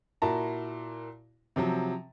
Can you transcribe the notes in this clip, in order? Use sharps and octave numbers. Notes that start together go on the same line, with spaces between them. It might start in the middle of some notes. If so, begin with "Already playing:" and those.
A#2 E4 F#4 A5 A#5
C3 F3 F#3